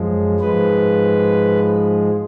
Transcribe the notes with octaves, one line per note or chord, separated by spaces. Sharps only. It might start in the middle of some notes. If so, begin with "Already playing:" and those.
Already playing: F#2 F3 G#3
G#2 F3 G#3 B4